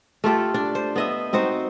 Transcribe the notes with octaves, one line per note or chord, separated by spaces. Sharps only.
A3 F4 G4 A4
D4
C5
B3 D#5 E5
C4 D#4 F#4 C5